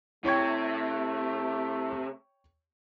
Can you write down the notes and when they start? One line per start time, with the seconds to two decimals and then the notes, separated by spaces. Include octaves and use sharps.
0.25 C3 A3 E4 C#5 G5 C#6 G#6